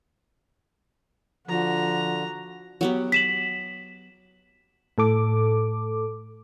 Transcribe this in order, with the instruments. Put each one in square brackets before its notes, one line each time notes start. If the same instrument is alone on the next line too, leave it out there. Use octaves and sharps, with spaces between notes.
[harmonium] D3 [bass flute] F3 [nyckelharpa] F#4 A#5
[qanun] F#3 B3 G4
[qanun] D6 [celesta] B6 E7 F#7
[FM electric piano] A2 A4 D6